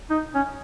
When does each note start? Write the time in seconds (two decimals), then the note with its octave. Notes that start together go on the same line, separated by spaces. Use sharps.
0.10 D#4
0.35 C#4